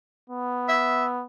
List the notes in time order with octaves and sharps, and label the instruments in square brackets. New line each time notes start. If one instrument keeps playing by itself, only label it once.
[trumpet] B3
[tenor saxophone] E5